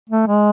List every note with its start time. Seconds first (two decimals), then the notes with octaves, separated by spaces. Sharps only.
0.09 A3
0.27 G#3